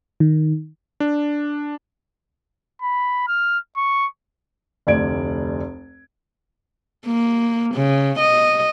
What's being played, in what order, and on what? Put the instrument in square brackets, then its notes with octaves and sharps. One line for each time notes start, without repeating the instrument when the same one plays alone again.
[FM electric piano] D#3
[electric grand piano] D4
[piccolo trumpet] B5
F6
C#6
[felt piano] F1 D2 D5 G#6 D7
[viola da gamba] A#3
C#3
D#5